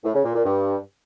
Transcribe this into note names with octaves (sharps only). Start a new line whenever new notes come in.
A2
C#3
A#2
A#2
G2